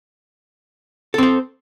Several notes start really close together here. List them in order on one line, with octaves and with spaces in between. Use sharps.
A4 C4 C5